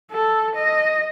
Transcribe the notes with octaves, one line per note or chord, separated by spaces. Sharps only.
A4
D#5